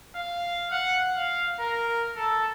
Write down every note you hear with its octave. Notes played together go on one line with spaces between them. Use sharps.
F5
F#5
F5
A#4
A4